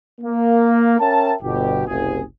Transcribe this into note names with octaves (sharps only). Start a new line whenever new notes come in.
A#3
C#4 A#4 E5 G5 A5
G1 B2 G4
F#1 C2 G#4